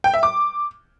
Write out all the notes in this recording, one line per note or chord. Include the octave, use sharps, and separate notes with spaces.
G5
E5
D6